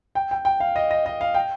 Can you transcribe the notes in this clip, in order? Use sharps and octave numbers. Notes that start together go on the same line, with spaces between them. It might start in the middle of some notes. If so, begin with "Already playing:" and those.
G5
G5
G5
F5
D#5
D#5
D#5
F5
G5